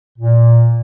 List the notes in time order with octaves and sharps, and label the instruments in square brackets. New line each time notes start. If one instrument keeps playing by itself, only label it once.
[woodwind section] A#2